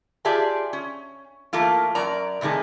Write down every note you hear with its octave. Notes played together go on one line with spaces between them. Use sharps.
F4 G4 G#4 D5 E5 A5
C#4
E3 A3 A#3 F4
F#2 A#4 D5 A#5
A2 C3 D#3 G#3 A3